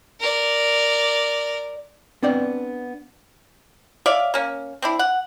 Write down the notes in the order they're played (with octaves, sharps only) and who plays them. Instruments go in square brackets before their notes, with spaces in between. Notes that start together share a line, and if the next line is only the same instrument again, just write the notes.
[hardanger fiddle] A#4 D5
[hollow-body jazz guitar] B3 C4 D4 C5 D5
[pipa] C#5 D5 E5 F5
A#3 C#4
C4 D4 E4
F#5